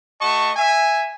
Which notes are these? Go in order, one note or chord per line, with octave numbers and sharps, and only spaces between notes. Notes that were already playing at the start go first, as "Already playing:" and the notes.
A3 F#4 D#5 A5 C#6
E5 G#5